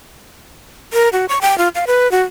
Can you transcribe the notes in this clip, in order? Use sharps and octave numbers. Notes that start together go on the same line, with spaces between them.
A#4
F#4
C#6
G5
F4
F5
B4
F#4